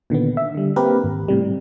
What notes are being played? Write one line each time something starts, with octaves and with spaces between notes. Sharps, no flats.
A#2 D3 D#3 B3
E5
D3 G3
A#3 C4 G4 A#4 B4
G#1
A2 C3 G3